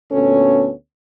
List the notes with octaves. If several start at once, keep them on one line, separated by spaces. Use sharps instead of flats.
D2 A#2 B3 C#4 A4 C#5